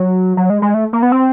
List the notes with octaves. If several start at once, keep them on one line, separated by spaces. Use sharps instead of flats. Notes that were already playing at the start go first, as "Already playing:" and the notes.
Already playing: F#3
F#3
G#3
G#3
A3
A#3
B3
C4